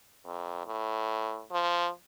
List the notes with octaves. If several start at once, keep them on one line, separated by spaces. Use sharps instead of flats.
F2
A2
F3